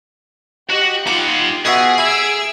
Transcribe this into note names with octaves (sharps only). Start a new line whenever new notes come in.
F#4 G4 D#5 F#5
D#4 F4 G4 F#5 D6
B2 F#4 G#4 E5
E4 E5 E6 D7